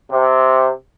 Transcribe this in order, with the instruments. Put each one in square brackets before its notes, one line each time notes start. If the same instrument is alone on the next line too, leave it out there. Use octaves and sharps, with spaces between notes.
[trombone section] C3